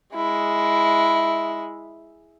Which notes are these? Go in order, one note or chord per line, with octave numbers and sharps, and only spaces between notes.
G#3 E4